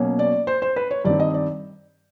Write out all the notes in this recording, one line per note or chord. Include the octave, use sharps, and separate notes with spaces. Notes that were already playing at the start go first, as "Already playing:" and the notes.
Already playing: B2 F#3 A#3 C#4
D5
C5
C5
B4
C#5
G2 D#3 G3 C4 D5
D#5
D5